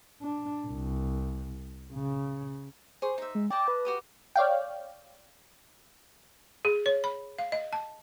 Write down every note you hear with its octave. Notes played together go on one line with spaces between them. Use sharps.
D4
C2
C#3
G#4 C5 C#6
D#4 E5
G#3
D5 D#5 G5 A5
B4
F#4 G4 D#6
C#5 D5 F5 G5
G#4
C#5
B5
F5
D#5
A5